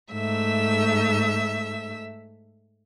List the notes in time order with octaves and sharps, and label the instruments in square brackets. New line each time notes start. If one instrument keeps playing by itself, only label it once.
[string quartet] G#2 A3 E5 E6